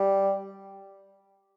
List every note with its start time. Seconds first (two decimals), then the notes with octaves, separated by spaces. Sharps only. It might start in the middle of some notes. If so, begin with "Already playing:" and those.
Already playing: G3